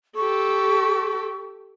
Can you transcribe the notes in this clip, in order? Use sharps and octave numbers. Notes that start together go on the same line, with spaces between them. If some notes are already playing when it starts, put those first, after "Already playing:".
G4 A4 C#6